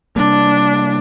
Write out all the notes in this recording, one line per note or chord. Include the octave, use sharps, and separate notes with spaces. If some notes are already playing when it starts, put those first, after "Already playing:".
C3 G3 A#3 D4